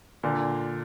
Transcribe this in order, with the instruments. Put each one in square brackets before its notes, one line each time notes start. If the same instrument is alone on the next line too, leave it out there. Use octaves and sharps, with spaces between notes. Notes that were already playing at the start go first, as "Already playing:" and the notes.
[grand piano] A#2 D3